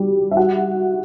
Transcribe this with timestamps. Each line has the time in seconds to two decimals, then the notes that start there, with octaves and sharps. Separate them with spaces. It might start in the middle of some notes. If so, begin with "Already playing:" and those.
Already playing: G3 F#4 G4
0.31 E5
0.37 F#4 F#5